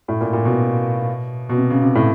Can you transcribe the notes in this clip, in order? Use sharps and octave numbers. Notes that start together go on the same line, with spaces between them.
A2
A#2
A#2
B2
B2
C3
C#3
C3
A2